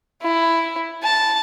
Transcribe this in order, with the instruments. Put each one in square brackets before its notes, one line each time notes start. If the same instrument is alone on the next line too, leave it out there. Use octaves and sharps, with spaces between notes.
[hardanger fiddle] E4
A5